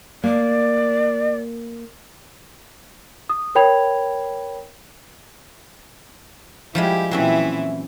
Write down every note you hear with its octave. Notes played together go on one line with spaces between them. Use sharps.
A#3 D5
D#6
A#4 C#5 G5 B5 G#6 F7
F3 G3 G#3 E4 G4
A#2 E3 F#3 C4 C#4 E4